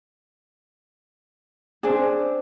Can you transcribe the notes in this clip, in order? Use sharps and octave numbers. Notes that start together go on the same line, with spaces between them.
C4 D4 G#4